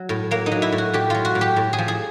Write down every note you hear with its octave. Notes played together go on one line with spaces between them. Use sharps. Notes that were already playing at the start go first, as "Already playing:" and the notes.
Already playing: F#3
A2
F#3 A#3
D#4
F#3
E4
A2
F#4
A2 G4
F#3 F4
F#4
A2
G4
A2
G#4
F3
G#4